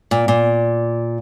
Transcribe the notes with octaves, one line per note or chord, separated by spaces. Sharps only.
A#2
A#2